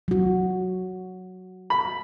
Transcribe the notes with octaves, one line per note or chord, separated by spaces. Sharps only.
F#3 F#4
B5